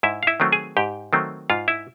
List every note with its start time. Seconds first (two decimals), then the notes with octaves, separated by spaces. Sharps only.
0.03 G#2 E4 E5
0.23 F5
0.27 E4 E5
0.40 D#3 F#3 A3 C4
0.52 G#4 G#5
0.77 G#2 G4 G5
1.13 D#3 F#3 A3 C4
1.50 G#2 F4 F5
1.68 E4 E5